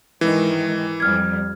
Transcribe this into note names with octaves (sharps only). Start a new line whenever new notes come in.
G#2 D#3 E3
F2 G3 F6 G#6